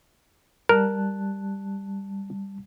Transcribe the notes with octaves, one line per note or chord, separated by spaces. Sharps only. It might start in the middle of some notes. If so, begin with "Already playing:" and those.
G3 A#4 A5 F#6